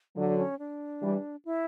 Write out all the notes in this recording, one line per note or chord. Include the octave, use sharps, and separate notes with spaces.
D3 F#3 D4
C#4
D4
E3 G3
E4